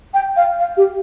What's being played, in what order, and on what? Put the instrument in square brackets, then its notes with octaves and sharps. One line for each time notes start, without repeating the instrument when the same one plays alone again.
[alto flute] G5
F5
F5
G4